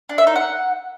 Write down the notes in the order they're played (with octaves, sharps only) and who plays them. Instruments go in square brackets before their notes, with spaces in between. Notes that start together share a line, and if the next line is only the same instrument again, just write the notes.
[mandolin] D4
E5
D#4
F#5